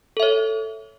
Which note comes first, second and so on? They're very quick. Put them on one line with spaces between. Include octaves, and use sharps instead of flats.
A4 E5 C#5